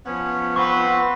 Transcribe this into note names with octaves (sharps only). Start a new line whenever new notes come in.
F3 B3 C#4
C4 B4 C5 F#5 C#6